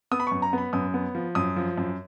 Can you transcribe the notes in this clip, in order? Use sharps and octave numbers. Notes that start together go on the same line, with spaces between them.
B3 D#6
B5
F#2 C#6
A#5
B3 B5
F#2 D#6
B3
F3
F#2 D#6
F3
F#2